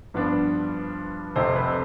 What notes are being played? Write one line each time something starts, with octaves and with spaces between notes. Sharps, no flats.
G2 F3 B3 D4
F1 F2 C3 C5
B4